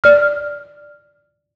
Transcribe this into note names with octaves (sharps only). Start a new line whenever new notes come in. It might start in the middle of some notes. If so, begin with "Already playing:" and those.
D5 F6